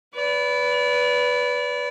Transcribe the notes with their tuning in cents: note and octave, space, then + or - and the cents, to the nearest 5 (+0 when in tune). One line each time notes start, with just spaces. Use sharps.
B4 +0 D5 -30